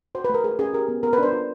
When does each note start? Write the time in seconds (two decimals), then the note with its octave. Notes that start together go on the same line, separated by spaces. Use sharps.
0.15 F#4 C5
0.24 B4
0.30 A3 A#4
0.44 A3 G#4
0.59 C#4 G#4
0.73 G4 A#4
0.88 B3
1.03 B3 A#4
1.13 B4
1.18 D4 C5
1.33 F4